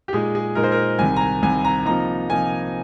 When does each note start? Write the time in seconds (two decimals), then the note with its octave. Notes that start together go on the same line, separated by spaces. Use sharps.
0.08 G4
0.13 A#2 G#3 D#4 G#4
0.35 G#4
0.55 A#2 G#3 D#4 A#4
0.64 C5
0.72 A#4
0.99 C2 C3 D#3 G#5
1.16 A#5
1.21 G#5
1.43 C2 C3 D#3 G#5
1.65 A#5
1.85 C3 F3 A#3 D#4 A#5
2.29 C3 F3 A#3 D#4 G#5